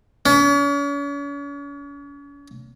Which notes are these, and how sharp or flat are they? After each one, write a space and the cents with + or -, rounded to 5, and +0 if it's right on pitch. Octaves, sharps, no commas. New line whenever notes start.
C#4 +40